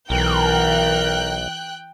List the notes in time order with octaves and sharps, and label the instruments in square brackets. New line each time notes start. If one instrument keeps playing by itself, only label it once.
[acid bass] B1 [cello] E3 [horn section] A#4 [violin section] G5 F#6